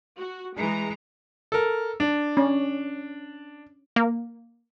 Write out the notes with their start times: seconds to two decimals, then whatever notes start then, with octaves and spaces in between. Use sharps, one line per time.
0.18 F#4
0.57 E3 G#3 A#5
1.52 A4 A#4
2.00 D4
2.37 C#4
3.96 A#3